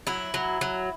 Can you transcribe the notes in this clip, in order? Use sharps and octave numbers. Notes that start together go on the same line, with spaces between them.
F#3 E4
F#3
F#3